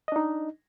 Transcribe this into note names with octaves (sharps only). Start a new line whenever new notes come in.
D4 D#4 D#5